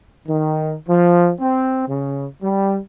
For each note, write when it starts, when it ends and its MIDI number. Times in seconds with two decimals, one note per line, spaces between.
0.27 0.74 51
0.89 1.31 53
1.40 1.85 60
1.87 2.26 49
2.43 2.78 55